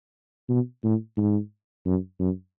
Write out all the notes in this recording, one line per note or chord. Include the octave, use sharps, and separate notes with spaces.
B2
A2
G#2
F#2
F#2